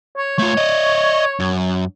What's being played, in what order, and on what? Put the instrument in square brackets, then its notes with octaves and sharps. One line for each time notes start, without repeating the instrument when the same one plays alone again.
[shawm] C#5
[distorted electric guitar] A3 F4 [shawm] C#5
[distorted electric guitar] D5 D#5
F#2